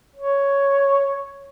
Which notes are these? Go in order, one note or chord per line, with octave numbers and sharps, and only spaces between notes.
C#5